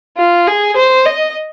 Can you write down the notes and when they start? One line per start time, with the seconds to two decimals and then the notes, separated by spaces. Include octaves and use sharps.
0.17 F4
0.47 G#4
0.76 C5
1.06 D#5